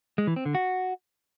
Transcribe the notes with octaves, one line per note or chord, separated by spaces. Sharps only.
G#3
E3
C4
D3
F#4